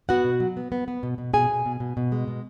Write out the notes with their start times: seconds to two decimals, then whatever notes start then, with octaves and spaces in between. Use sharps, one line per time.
0.09 B3 F#4 F#5
0.25 B2
0.40 F#3
0.57 B3
0.72 B3
0.88 B3
1.03 B2
1.18 B2
1.34 B2 G#4 G#5
1.50 B2
1.66 B2
1.80 B2
1.97 B2
2.12 G#3
2.28 B2